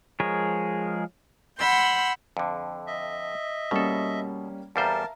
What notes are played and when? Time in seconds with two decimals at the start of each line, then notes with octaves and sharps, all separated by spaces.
0.20 F3 G#3 G#4 A#4 C#5
1.59 F#5 B5 C6 E6 G6
2.37 F2 D3
2.87 D#5 E5
3.71 B2 G3 A#3 C#4 A4
4.76 E2 G3 A#4 C5 E5 F5 A5 A#5